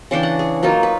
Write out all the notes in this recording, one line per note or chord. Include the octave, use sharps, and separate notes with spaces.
C#3 E3 D4 G5
F#5
G#4
F#3 A#3 D#4 F4
B4